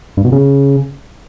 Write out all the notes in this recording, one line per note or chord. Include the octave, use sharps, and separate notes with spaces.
G2
B2
C#3